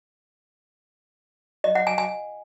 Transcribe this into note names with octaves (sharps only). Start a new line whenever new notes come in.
D#5
F#5
G#5
G#5